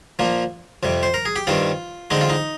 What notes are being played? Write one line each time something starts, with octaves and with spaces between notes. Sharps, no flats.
A#2 F3 A#3
F2 C3 G3
C5
A#4
G#4
G4
G2 D#3 G3 C4 F4
D3 G#3 C4 D#4
F4
D#4